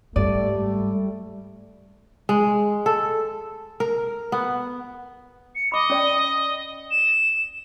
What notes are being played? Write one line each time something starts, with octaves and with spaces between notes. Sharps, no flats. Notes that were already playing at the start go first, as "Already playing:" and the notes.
G#2 G3 A3 D5
G#3
A4
A#4
B3
C#7
D#5 B5 D6
C#4 D5 G5
E7